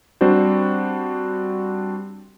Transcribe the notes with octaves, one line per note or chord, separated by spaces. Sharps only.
G3 C4 D4 F#4 C5